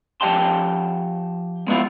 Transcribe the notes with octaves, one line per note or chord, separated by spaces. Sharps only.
F3 G4 D#5 G5 A5 C6
E2 G#3 B3 E4 F4